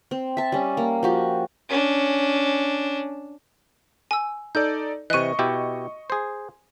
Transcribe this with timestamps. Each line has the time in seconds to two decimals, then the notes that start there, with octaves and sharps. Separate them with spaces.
0.11 C4
0.37 E5 A5
0.52 G3 C#4
0.77 A#3
1.03 F3 F#4 G4
1.69 C#4 D4
4.11 G#5 E6
4.55 D#4 A4 D5 G6
5.10 C3 E3 D#5 C#6 F#6 D#7
5.39 B2 E4 G4
6.10 G#4 C5